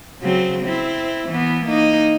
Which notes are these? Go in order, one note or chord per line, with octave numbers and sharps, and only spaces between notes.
C#3 F#3 C4
C4 E4
E3 B3
A#3 D#4